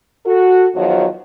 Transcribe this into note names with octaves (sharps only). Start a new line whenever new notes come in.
F#4 A4
E2 D#3 F3 F#3 F#4 C#5